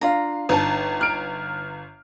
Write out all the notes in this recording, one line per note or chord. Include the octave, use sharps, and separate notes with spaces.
D4 F4 F5 A#5
G1 D#4 G5 A5
A#5 F6 D7